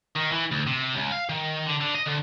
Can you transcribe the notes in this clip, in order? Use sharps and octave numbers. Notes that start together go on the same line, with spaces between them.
D#3
E3
D2
C3
C#2
F5
D#3
D3
D3
D#5
D2